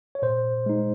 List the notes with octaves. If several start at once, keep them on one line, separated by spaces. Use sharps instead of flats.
C#5
A#2 C5
G#3 D#4